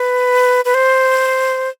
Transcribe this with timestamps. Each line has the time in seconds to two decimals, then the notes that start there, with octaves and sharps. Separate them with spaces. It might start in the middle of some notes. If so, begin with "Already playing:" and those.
Already playing: B4
0.65 B4
0.74 C5